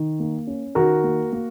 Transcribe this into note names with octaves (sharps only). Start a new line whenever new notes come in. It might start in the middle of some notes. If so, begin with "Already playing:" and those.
Already playing: D#3
A#3
C#4
D#3 F#4 A#4
A#3
A#3